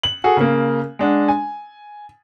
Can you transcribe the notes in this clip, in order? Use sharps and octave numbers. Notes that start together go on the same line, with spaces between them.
F#7
F#4 G#4 A4
C#3 A#3
G#3 D4 F#5
G#5